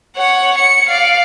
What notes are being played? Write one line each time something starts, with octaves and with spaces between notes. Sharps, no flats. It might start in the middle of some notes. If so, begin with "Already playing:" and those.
C#5 F#5
C#7
D5 F5